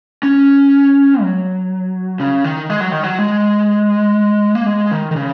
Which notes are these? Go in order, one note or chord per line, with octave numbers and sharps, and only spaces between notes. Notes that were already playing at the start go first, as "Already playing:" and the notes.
C#4
F#3
C#3
D#3
G#3
F#3
D#3
F#3
G#3
A#3
G#3
D#3
D#3
C#3